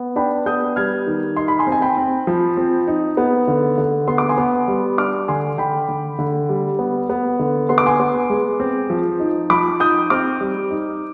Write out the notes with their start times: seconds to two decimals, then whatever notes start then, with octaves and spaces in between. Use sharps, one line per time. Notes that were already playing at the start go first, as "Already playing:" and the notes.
Already playing: B3
0.16 D4 G5 B5
0.46 B3 D#6 G6
0.76 G3 F6 G#6
1.07 D#3
1.36 D#4 C6
1.48 B5
1.59 G#5 C6
1.67 C4
1.72 G#5
1.82 G5 B5
1.97 C4
2.27 F3
2.57 C4
2.87 D#4
3.17 B3
3.48 D3
3.78 D3
4.07 B3 C6
4.18 D6
4.29 G#5 C6
4.38 B3
4.68 G3
4.98 D4 D6 F6
5.28 D3 G#5 C6
5.58 D3 G5 B5
5.88 D3
6.19 D3
6.49 G3
6.79 B3
7.09 B3
7.39 D3
7.69 B3 C6
7.78 D6
7.86 G#5 C6
8.00 B3
8.30 G#3
8.60 C4
8.90 F3
9.20 D#4
9.50 F3 B5 D6
9.80 D#4 D#6 G6
10.10 C4 D6 F6
10.41 G3
10.71 D#4